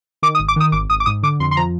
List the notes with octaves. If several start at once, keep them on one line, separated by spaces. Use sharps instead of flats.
D#3 D6
D#6
G#1
D6
D#3 D#6
G#1 D6
G#1 D#6
D6
G#2 D#6
D3 D6
F2 C6
C6
F3 A#5